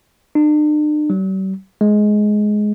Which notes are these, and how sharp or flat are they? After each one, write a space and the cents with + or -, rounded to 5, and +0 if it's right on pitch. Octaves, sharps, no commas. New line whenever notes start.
D4 +45
G3 -45
G#3 +15